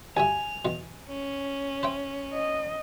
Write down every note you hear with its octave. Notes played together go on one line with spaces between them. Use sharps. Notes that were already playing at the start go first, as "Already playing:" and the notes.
D2 G2 E5 G#5 F7
E2 B2
C#4
C5 E5 G5
D#5